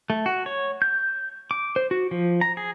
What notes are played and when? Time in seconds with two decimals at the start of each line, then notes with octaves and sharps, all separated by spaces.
0.10 A3
0.26 F#4
0.46 C#5
0.82 G6
1.51 D6
1.76 C5
1.91 F#4
2.11 F3
2.41 A#5
2.57 G#4